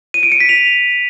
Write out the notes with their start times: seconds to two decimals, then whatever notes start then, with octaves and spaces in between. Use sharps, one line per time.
0.14 D#7
0.23 D7
0.32 C#7
0.40 B6
0.49 F7